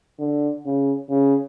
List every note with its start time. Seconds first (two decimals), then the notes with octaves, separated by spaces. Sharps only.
0.19 D3
0.66 C#3
1.09 C#3